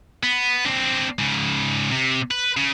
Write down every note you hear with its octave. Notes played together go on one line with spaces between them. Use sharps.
B3
C4 D4
G#2 C#3
C3
B4
C#3